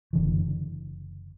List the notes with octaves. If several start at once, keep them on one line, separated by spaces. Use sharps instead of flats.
F#1 D3 E3